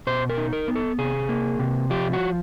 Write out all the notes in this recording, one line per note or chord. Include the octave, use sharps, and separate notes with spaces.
B2 C5
A#4
D#4
A#4
B3
A4
C3 G#4
A#3
C3
F3 G4
F#4